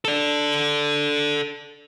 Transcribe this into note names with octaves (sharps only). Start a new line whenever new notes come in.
A4 D5